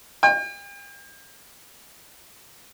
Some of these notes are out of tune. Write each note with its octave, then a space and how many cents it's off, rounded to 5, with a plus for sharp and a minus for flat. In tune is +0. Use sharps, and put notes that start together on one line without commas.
G5 +40